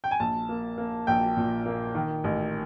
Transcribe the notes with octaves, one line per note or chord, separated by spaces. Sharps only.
G5
G#5
A#1 A5
A#3
A#3
A#1 G5
A#2
A#3
D#3
A1